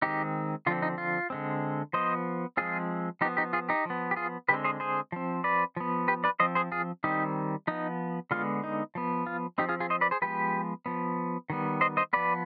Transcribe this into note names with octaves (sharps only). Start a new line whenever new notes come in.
D#3 G#3 C4 D#4 G4
D3 F3 C4 F4
D#4
F4
D3 G#3 C4
F3 B3 C5 D#5
F3 G#3 C4 F4 G#4
F3 B3 D#4 G4
D#4 G4
F4 G#4
D#4 G4
F3 B3
G4
F4 G#4
D3 G#3 C4 G4 B4
G#4 C5
G#4 C5
F3 C4
B4 D5
F3 B3
G4 B4
B4 D5
F3 C4 C5 D#5
G#4 C5
F4 G#4
D#3 G3 C4 D#4 G4
F3 B3 D#4
D3 G#3 B3 F4
D#4
F3 B3
F4
F3 C4 D#4 G4
F4 G#4
F4 G#4
C5 D#5
B4 D5
G#4 C5
F3 G#3 B3 G4 B4
F3 B3
D#3 G3 B3
C5 D#5
C5 D#5
F3 B3 B4 D5